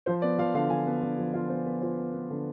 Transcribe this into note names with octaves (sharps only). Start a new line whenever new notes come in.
F3 C5
B3 D5
F3 F5
D3 F5
F3 G#5
B3
D3
F3
F4 F5
B3 C5
B3 B4
F4 C5
B3
B3
D3